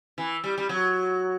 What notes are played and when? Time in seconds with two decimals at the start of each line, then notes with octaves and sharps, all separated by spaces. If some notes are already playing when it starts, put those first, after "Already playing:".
0.18 E3
0.44 G3
0.58 G3
0.69 F#3